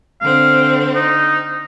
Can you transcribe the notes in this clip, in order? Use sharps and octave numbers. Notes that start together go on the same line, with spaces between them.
D3 C4 F5
D#4